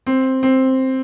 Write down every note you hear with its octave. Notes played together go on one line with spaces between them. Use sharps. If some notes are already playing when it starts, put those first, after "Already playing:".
C4
C4